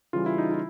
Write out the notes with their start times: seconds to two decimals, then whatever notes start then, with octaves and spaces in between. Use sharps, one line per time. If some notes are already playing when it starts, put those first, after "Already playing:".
0.13 C#3 E3 G3 F4
0.26 E4
0.38 D#4
0.51 E4